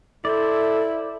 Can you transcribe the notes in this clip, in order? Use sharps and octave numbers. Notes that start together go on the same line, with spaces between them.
E4 A4 C5 D5